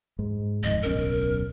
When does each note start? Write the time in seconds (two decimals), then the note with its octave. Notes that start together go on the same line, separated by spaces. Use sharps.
0.19 G#2 G#3
0.63 D1 F2 G#2 D#5
0.83 D1 B1 C#4 A#4